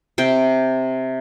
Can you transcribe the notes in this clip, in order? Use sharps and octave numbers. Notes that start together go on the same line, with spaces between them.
C3 C5 G5